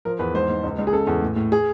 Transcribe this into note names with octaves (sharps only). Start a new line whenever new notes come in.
F3 A#4
E2 B4
G#2 C5
G#2
C#2
C#2
G#4
C#3 A4
E2
A2
A2
G#4